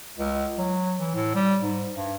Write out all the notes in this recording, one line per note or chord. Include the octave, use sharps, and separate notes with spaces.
C#2
F#3
E3
A2
G3
G#2
G2